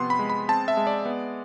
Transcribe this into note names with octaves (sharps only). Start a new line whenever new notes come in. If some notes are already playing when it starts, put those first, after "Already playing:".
Already playing: C3 F3 B3 C6
B5
G#3
B5
C4 A5
E5
G#3
D5
B3